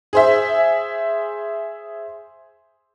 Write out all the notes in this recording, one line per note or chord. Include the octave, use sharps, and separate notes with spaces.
G#4 C5 E5